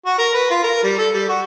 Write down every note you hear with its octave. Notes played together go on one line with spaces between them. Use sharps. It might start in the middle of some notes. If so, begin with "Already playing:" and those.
F#4
A#4
B4
F4
A#4
G3
A4
G3
F#4